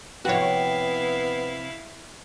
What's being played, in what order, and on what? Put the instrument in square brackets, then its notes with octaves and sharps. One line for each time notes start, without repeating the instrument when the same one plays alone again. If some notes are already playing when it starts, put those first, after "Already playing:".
[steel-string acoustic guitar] C3 F3 G5 [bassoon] B3 [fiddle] E4 F5 [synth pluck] F#4 C#5